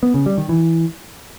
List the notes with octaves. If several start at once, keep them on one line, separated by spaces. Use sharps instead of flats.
B3
C#3
G3
D#3
E3